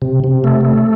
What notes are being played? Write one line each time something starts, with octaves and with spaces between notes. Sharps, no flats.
C3
C3
A3
A3